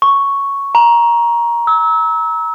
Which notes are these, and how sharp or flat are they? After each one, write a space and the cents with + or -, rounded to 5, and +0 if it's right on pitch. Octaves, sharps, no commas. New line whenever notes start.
C#6 +0
A#5 +15
E6 -30